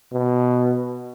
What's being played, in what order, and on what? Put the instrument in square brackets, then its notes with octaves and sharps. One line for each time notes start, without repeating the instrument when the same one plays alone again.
[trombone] B2